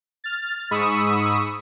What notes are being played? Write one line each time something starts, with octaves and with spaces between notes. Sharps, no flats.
F6 A6
G#2 B5 C#6 D#6 E6